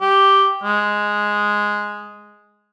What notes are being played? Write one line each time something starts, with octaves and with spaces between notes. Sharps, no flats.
G4
G#3